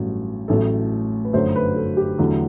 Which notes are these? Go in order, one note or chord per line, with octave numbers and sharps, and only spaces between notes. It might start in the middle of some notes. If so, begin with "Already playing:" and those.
Already playing: A1 G2 F#3 A3
A1 A2 F#3 A3 A4
B4
G1 F#2 F#3 A3 C5
B4
A4
G4
E2 D3 F#3 A3